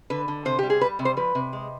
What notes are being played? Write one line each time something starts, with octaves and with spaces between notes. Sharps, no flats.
D3 B4
D3
C3 C5
G3 G4
G#4
G3 B4
C3
C5
F3 B4
C3
G#3